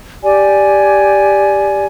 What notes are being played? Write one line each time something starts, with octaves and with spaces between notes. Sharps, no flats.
G4 D5 G#5